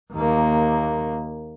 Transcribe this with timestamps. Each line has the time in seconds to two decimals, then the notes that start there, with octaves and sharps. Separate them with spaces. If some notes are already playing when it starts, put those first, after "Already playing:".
0.13 D#2 A#3